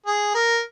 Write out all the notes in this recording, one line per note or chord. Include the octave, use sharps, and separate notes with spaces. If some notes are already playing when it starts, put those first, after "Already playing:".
G#4
A#4